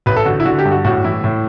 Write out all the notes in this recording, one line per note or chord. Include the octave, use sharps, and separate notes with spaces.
A1 B4
A4
D3 F#4
E4
D3 F#4
G4
G2
F#4
A2 F#4
E3 E4
A2